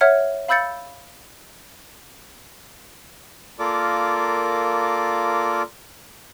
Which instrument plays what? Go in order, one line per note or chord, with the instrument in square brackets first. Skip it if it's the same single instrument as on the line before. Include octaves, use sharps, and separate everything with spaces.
[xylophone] C#5 E5 F#5 F6 G#6 C#7
F5 B5 E6 G6 A6 C#7
[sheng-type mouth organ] A#3 F4 A4 A#4 D5 D6